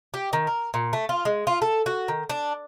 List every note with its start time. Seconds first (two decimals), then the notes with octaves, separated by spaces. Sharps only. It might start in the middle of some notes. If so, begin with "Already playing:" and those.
0.14 G4
0.33 D#3
0.47 A#4
0.74 A#2
0.93 A3
1.09 F4
1.25 G#3
1.47 F4
1.62 A4
1.86 F#4
2.08 D#3
2.29 D4